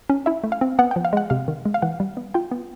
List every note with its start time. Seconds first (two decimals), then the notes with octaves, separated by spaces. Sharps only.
0.09 C#4
0.26 E4 E5
0.44 A3
0.52 F5
0.61 C4
0.79 B3 F#5
0.91 G5
0.96 F3
1.05 F5
1.13 G#3 F#5
1.30 C3 F5
1.48 D#3
1.65 G#3
1.74 F5
1.82 E3 F#5
2.00 G3
2.17 B3
2.34 F4 G5
2.51 B3